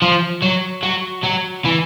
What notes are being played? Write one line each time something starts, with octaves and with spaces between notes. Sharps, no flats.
F3
F#3
F#3
F#3
E3